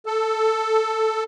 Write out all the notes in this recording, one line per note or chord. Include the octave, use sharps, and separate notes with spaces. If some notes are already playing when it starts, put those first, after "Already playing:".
A4